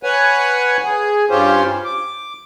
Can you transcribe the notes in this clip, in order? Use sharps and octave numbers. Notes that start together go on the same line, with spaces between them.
B4 C#5 F#5 G#5
G#4
G2 C#4 F4 G4 C5
D6